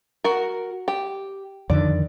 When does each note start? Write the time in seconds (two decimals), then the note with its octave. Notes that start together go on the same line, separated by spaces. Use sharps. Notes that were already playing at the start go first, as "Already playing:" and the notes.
0.24 F#4 A#4
0.88 G4
1.70 F2 D3 D#3 D5